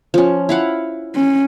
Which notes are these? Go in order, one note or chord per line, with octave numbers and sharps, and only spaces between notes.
F3 C#4
E4 F5 F#5
C#4